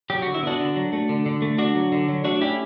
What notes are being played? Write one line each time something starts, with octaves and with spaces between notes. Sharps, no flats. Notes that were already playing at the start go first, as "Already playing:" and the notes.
F#3 G4
D3 F#4
E4
B3 D4 F#4
D3
F#3
A3
D3
D3
A3
D3 D4 F#4
F#3
D3
F#3
A3 D4 F#4
C#4 E4 G4